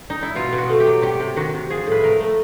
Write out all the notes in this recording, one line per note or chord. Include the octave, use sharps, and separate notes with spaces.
D#4
E4
B2 F4
B2
F#4
A3
G4
F#3
C3 G4
C3
D#3 F#4
C3
F3 G#4
A2
B4
A3 A#4
A3